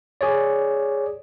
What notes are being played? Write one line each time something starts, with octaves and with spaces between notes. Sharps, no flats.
G#4 C#5 D5